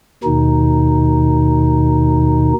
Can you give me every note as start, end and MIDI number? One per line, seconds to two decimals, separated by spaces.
0.24 2.53 39
0.24 2.53 47
0.24 2.53 51
0.24 2.53 63